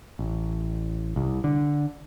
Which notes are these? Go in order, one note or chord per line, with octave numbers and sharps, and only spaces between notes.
A1
C2
D3